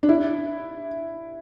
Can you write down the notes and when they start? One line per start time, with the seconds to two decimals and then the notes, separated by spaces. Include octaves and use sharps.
0.03 D4
0.09 E4